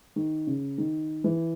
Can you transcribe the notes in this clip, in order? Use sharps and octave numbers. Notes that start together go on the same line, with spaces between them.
D#3
C#3
D#3
E3